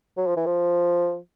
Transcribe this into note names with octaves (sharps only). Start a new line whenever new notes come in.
F#3
F3
E3
F3